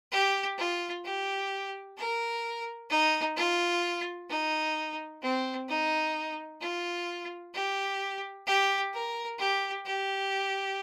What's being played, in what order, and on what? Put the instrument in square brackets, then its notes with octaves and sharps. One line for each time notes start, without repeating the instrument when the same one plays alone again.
[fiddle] G4
F4
G4
A#4
D#4
F4
D#4
C4
D#4
F4
G4
G4
A#4
G4
G4